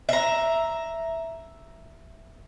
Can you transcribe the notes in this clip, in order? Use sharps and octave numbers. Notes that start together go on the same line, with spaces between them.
E5 A#5